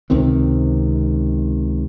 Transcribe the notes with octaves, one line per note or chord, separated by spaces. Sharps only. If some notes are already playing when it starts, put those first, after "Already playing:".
C#2 C3 D#3 C4